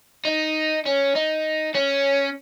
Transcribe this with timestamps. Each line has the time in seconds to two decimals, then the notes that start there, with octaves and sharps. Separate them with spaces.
0.25 D#4
0.86 C#4
1.16 D#4
1.75 C#4